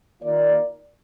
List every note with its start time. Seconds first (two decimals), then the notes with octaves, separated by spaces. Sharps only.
0.23 D#3 A#3 F4 A#4 D5